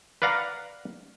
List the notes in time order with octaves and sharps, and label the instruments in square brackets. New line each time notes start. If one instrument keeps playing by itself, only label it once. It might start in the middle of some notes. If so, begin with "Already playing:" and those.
[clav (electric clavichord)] B4 D5 F5 F#5 A#5